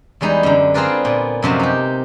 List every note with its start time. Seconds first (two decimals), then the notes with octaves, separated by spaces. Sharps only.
0.21 E2 G3 G#3 D#4 B4
0.43 F#2 D3
0.74 C4 F4 G#4 A#4 B4 D5
1.05 A#2 B3
1.42 F#2 C3 F3 G#3 F#4
1.60 D#4 G4